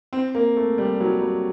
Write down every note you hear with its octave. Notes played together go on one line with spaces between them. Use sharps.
C4
A#3
A3
G3
F#3
G3